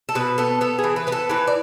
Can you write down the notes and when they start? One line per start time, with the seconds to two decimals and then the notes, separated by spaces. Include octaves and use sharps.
0.09 A4
0.15 B2 B4
0.38 B3 A4
0.61 B3 A4
0.78 G#4
0.84 E3
0.96 B4
1.07 B3 B4
1.12 A4
1.30 E3 B4
1.47 D5